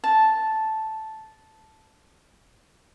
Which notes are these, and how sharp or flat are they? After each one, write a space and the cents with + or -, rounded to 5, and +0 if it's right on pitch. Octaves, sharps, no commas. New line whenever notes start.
A5 -5